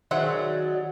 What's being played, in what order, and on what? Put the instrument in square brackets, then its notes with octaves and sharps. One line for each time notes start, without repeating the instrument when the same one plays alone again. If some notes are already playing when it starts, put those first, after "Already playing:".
[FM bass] D#3 [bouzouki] F#3 G#3 F#4 [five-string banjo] C5 E5 F#5 [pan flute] D5